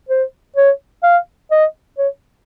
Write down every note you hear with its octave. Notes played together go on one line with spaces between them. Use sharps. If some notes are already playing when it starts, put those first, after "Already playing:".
C5
C#5
F5
D#5
C#5